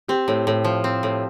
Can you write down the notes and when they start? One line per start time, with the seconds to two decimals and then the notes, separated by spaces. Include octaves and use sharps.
0.08 C4 G4
0.28 A2
0.47 A2
0.64 F3
0.84 C4
1.03 A2